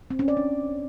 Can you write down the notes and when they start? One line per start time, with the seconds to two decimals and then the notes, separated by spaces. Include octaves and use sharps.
0.10 C4
0.19 C#4
0.28 D5
0.37 D4